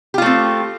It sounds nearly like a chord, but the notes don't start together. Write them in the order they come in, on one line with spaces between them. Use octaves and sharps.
G4 F4 A3 C4